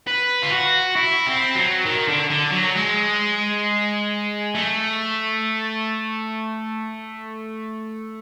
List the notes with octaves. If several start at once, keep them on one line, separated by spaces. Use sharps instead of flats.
B4
F4
F#4
E4
C4
F#3
D#3
D3
D3
F#3
G#3
A3